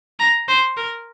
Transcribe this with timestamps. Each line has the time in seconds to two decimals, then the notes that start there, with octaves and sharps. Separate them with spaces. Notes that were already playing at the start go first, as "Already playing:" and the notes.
0.20 A#5
0.48 C5
0.77 A#4